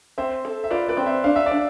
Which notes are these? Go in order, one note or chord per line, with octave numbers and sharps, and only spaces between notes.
C4 C5 E5
A4
E5
F4 B4 D5
B4 D5
C4
C5 E5
D4 F5
E5
D4 D5